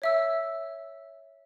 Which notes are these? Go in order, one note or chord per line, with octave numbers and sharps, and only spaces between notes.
C#5 E5 E6